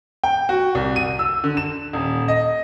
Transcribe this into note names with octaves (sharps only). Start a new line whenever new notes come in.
G5
F#4
C2
D#7
E6
D3
E7
D#1
D#5